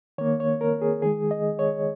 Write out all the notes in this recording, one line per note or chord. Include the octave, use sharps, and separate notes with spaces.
D#3 A#3 C#5
C#5
A#4
G#4
D#3 G#3 G#4
D#5
C#5